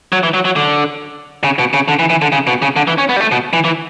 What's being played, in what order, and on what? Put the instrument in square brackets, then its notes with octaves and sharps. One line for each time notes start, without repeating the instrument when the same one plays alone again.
[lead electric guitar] F#3
E3
F#3
F#3
D3
C#3
B2
C#3
D3
E3
E3
D3
C#3
B2
C#3
D3
E3
C#4
B3
G3
A3
B2
E3
E3